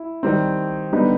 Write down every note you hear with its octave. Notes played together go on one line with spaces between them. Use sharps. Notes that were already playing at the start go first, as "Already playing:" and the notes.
Already playing: E4
D#3 G3 C4
D3 G3 B3 D#4